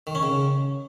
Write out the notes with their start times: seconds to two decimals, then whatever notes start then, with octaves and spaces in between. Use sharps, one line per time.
0.07 D#3
0.15 C#4
0.23 C#3